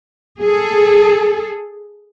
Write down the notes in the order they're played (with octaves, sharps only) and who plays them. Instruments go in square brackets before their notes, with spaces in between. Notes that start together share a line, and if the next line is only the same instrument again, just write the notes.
[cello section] G#4 A4